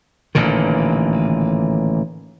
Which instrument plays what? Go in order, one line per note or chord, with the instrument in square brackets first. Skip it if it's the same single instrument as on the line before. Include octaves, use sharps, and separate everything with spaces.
[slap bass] A1 A#2 D3 D#3